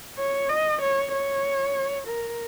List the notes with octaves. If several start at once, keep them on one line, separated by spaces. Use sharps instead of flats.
C#5
D#5
C#5
C#5
A#4